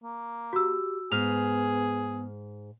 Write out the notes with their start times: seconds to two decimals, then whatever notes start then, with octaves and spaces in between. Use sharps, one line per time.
0.03 A#3
0.53 F#4 G4 E6
1.12 G#2 B3 G#4 F6 F7